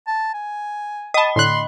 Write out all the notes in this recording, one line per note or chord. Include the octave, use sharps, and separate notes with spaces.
A5
G#5
D#5 A5 B5 D#6
A2 D3 C6 F#6